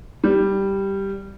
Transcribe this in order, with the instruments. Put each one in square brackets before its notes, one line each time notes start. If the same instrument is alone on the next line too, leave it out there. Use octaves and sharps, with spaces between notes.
[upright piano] G3